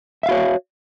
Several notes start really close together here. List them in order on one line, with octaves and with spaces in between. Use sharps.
E5 F5 F#4 C#5